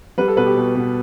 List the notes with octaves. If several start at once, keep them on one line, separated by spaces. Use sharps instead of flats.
G3 B4
A4
B2 B4
G4
B2
B2